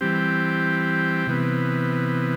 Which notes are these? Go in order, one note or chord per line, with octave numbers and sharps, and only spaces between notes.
E3 G3 C4 G4
C3 E3 B3